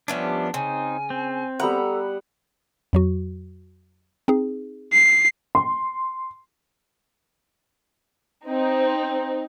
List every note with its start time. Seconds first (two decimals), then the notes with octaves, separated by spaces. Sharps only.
0.08 F3 G3 A3 B3 C#4 D4
0.54 C#3 C4 D#4 G#5
1.10 C4
1.60 G3 B3 A4 F#5 A#5
2.93 F2 F#3 F#4
4.28 C4 D#4 G#4
4.93 C7
5.55 C6
8.48 C4 D#4